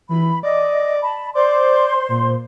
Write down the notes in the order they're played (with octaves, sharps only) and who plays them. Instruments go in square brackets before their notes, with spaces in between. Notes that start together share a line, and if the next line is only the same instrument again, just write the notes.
[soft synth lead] E3 [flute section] B5
[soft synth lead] D5 [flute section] D#5
[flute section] A5 B5
[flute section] C5 C6 [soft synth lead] D5
[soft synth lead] A#2